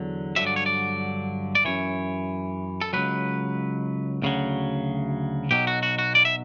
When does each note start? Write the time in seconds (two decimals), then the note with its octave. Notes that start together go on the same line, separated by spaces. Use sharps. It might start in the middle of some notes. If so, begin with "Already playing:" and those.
Already playing: E2 D3 F#3
0.36 G2 D3 F#3 E5
0.47 D5
0.56 C#5
0.66 D5
1.55 D5
1.65 F#2 E3 C#5
2.81 A4
2.93 C#2 B2 F#3 B4
4.22 D2 C#3 F#3
5.51 B1 B2 F#3 G4
5.67 F#4
5.83 F#4
5.99 F#4
6.15 D5
6.25 E5